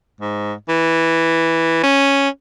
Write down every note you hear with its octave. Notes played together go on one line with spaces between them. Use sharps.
G#2
E3
C#4